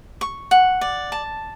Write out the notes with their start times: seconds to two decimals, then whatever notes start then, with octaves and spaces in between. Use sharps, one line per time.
0.21 C#6
0.51 F#5
0.81 D5
1.12 A5